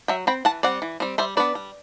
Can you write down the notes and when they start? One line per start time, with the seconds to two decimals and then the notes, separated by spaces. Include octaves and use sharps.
0.08 F#3 E5 G5
0.27 C4 G5 B5
0.45 E3 F#5 A5
0.63 G3 C4 D5 F#5
0.82 E3
1.00 G3 C4
1.18 G3 C5 E5
1.37 B3 D4 B4 D5
1.55 G3